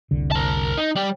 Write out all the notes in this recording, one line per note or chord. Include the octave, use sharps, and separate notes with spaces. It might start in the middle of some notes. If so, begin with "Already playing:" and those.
F1 C2 D3
A#4 A5
D#4
G3